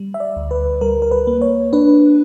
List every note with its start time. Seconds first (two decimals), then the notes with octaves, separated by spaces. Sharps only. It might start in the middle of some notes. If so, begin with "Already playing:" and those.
Already playing: G3
0.14 E5
0.20 D5
0.37 D2
0.51 B4
0.81 G3 A#4
1.02 A#4
1.11 B4
1.27 A#3
1.41 C#5
1.73 D4 B4